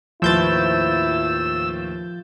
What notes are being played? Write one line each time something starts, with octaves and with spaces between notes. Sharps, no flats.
D#2 A2 F3 E4 B4 E6 G6 A6